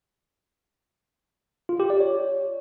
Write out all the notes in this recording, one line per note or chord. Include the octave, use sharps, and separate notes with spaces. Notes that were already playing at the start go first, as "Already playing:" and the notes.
F4
G4
D5
C#5